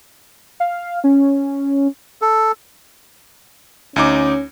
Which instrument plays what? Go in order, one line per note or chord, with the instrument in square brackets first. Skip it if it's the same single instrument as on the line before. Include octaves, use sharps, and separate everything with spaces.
[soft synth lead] F5
C#4
[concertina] A4
[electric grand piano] D2 D#4 D6 [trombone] C#4